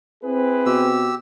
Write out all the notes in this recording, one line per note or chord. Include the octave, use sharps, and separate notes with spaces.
C4 E4 G#4 B4
B2 G4 E6